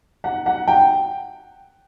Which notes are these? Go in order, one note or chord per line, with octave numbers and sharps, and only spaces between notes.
F#5
F#5
G5